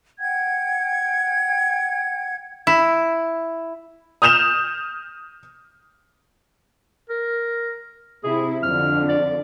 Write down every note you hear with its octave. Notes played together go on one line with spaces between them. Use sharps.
F#5 G5 G#6
E4
D#6 F6 G6 E7 F7
A#4
C3 E4 G#4
F2 D3 F6
D5